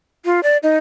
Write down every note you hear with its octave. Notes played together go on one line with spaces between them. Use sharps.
F4
D5
D#4